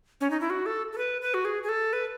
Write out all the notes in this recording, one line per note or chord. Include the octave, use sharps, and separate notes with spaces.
C#4
D#4
E4
F#4
A4
A4
B4
B4
F#4
G#4
G#4
A4
B4